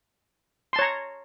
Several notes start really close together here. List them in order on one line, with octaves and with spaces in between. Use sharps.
C6 A5 C#5 A#5